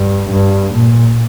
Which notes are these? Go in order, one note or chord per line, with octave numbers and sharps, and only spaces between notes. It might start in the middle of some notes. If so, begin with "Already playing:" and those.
Already playing: G2
G2
A#2